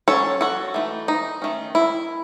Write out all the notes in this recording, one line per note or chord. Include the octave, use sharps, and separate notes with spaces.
F#3 C#4 A4 C#5
F#4 A4
E3 A3 D#4
D#4
D#3 A3 C#4
E4